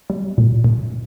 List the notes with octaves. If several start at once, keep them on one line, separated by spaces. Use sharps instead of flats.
G3
A#2
A#2